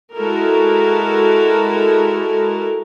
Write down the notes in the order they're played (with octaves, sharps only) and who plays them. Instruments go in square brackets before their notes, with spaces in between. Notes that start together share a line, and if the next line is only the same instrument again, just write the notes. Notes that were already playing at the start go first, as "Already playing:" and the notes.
[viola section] G#3 E4 F#4 A4 A#4